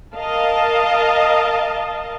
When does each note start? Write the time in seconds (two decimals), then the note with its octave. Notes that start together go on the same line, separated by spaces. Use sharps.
0.15 A#4 D#5 F5 A5